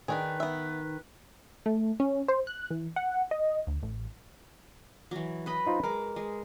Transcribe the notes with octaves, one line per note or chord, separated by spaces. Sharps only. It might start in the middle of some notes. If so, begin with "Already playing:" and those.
D#3 D4 D#4 G#4 B4
B3 E5
A3
C#4
C5
F#6
E3
F#5
D#5
D2
A1
E3 F#3
B4 D#5 B5
D#4 F4 C5
G#3 A#4 D6
G#3